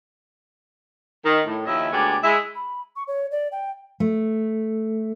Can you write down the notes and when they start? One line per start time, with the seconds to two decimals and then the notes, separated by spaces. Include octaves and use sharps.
1.25 D#3
1.47 A2
1.67 D#2 F3 C#4 E4 D#5 E5
1.93 D2 G#3 B3 G4 C#5 D5
2.23 G#3 E4 E5
2.55 B5
2.96 C#6
3.08 C#5
3.31 D5
3.52 G5
4.00 A3